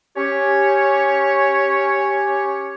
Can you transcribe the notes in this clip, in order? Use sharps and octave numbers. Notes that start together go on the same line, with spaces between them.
C#4 G4 C#5